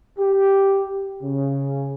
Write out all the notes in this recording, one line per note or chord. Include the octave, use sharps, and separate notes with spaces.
G4
C#3